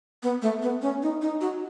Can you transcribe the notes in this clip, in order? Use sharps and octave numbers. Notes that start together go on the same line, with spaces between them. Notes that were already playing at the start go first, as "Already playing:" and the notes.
B3
A3
B3
C#4
D#4
D#4
F#4